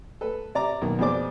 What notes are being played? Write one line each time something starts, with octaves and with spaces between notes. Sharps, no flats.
A4 B4
C3 D5 A#5 D6
B1 D#3 A#3
F2 B2 G#4 C5 D5 D6